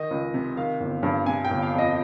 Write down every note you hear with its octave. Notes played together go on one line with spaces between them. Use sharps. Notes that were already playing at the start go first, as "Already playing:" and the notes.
Already playing: D#3 D#5
C#2
C3
D#3 F5
G1
G2
C3 G#5
G5
G1
F5
F2
D#5